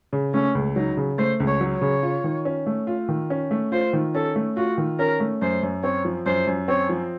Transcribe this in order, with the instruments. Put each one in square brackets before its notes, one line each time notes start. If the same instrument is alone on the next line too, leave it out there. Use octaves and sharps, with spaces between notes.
[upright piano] C#3
[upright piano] A3 [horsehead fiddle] C#4
[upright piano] C#2
[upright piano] F#3 [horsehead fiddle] D#4
[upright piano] C#3
[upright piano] A3 [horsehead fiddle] C5
[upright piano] C#2
[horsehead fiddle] C#5
[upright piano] F#3
[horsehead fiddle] C#5
[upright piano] C#3
F4
D#3
C#4
A3
F4
D#3
C#4
A3
[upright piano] F4 [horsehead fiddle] C5
[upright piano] D#3
[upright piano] C#4 [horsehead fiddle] A4
[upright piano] A3
[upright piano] F4 [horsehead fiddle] F#4
[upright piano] D#3
[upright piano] C#4 [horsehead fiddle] A#4
[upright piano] A3
[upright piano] F#2 [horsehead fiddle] C5
[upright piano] F#2
[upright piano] C4 [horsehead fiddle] C#5
[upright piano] F3
[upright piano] F#2 [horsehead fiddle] C5
[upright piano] F#2
[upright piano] C4 [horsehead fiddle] C#5
[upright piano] F3